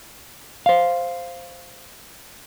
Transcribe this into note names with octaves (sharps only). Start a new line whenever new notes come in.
C5 F5